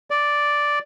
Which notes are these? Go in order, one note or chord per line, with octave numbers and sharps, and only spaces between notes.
D5